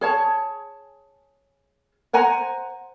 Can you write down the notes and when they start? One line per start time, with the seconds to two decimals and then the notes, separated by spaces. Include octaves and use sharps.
0.01 G#4 C#5 A5
2.13 C5 F#5 G#5 A#5